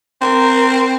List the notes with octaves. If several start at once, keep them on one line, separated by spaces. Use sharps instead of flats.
C4 A#4